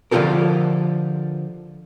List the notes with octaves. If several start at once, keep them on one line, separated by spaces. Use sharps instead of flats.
D3 F3 F4 G4 A4 A#4